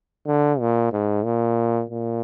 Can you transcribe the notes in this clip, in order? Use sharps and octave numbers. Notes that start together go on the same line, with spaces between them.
D3
A#2
G#2
A#2
A#2